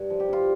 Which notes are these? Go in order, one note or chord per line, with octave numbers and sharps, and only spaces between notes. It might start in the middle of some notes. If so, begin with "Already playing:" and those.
Already playing: G2
F3
G4
G2 F4